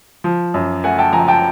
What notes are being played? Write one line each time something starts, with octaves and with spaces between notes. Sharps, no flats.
F3
F#2
A3 F#5 G#5
G5 A5
F3 G#5 A#5
G5 A5